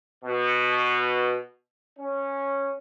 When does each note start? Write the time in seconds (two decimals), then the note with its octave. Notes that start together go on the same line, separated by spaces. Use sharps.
0.24 B2
1.98 C#4